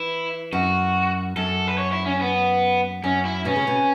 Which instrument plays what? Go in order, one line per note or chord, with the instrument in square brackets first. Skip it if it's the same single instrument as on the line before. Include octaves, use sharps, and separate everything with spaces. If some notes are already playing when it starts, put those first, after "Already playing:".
Already playing: [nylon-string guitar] E3 [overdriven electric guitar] E4
[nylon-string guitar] F#2 [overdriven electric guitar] F#4
[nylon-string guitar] F#2 [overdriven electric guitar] A4
[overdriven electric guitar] B4
C#5
E4
C#4
B3
[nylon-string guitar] F#2 [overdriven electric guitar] C#4
[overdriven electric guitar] E4
[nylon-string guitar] B2 [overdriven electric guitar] C#4
[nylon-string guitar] C#3
B2